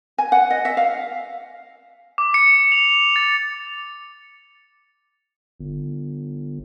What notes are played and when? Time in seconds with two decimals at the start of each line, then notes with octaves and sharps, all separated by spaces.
0.18 G#5
0.32 F#5
0.50 D#5
0.65 E5
0.77 F5
2.18 D6
2.34 C#7
2.72 F7
3.16 A6
5.60 G1